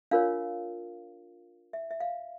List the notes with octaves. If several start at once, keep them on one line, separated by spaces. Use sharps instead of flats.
D4 F4 A#4 C#5 F5
E5
E5
F5